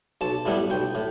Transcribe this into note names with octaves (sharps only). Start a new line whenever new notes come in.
B1 A5
A2 G3 B3 E4
B1 G5
A2